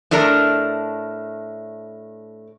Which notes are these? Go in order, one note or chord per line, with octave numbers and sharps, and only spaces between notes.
A2 A3 D4 A#4